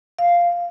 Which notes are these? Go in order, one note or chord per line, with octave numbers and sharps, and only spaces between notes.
F5